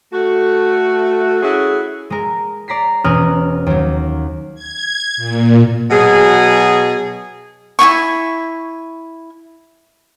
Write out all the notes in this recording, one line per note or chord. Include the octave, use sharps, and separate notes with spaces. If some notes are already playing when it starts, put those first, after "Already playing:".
A3 F#4
C#4 E4 F#4 G#4 A4
G#3 A#4
D5 A#5 B6 C7
E1 C#4 A#4 D#6 F6 F#6
D#2 F#3
G#6
A#2
B2 F#3 G#4
E4 F4 G#5 C#6